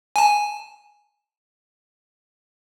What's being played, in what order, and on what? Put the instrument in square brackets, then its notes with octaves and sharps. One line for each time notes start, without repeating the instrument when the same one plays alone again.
[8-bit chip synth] G#5 A5